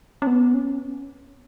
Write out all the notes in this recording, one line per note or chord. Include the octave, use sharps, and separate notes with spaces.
C#4
B3
C#4